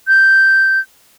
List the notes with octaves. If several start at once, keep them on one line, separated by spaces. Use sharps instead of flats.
G6